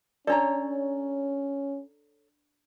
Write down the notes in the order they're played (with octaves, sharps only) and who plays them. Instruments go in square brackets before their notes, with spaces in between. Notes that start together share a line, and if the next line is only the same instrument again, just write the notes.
[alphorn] C#4 [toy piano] D4 D5 [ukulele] A4 C#5 A#5